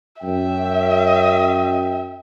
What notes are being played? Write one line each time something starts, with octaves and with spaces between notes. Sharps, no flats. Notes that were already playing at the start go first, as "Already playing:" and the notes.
F#2 E5 G5